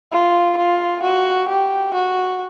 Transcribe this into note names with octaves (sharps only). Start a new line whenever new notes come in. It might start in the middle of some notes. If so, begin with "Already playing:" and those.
F4
F4
F#4
G4
F#4